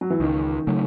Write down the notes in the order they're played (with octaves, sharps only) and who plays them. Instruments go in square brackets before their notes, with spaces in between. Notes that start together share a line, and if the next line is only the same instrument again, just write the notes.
[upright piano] F#3
E3
[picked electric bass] C#2 [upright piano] D#3
[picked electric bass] C#3 F#3 A3